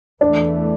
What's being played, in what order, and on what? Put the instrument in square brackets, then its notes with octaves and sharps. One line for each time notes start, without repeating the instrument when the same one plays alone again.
[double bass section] E2 E3 A3 [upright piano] D4